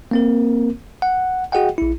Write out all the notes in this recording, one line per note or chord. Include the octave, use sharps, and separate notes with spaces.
A#3 C4 A#4
F#5
F#4 G#4 D#5 F#5 G5
A#1 E4